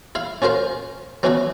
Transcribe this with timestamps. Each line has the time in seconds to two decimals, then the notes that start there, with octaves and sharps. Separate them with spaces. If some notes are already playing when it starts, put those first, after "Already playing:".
0.15 E4 F5
0.42 C#4 F4 F#4 A#4 C5
1.23 F#3 B3 C#4 D4 E4 F#4